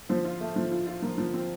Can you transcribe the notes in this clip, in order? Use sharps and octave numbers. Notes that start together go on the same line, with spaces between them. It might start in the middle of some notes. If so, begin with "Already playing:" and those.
F3 C5
F4
A3
F3
F4
F4
F3 A#4
F3
C4